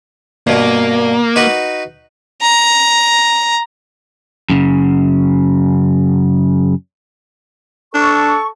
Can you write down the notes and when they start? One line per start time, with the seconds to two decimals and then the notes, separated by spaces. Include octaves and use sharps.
0.47 G2 B2 A#3
1.36 D#4 F#4 B4
2.42 A#5
4.50 F#2 C#3
7.94 D4 A4 C#6